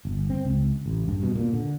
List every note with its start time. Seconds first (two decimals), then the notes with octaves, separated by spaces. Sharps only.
0.05 G1
0.30 C4
0.45 C#2
0.86 A1
1.08 G2
1.23 B2
1.36 A#2
1.53 D3